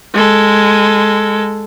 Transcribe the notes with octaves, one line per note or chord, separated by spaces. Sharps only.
G#3 A4